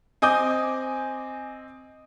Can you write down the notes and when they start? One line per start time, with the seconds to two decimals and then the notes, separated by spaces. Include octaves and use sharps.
0.22 C4 D#5 G#5 D6 D#6 G6